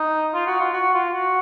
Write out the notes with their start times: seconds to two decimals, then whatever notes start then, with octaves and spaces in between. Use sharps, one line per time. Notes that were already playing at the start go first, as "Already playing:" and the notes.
Already playing: D#4
0.34 F4
0.47 F#4
0.60 F4
0.73 F#4
0.94 F4
1.13 F#4